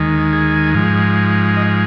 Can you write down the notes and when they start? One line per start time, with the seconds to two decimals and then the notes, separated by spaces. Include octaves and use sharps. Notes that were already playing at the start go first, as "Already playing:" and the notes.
Already playing: D#2 D#3 G#3
0.33 G#4
0.75 G#2 F3 G#3
1.56 D#5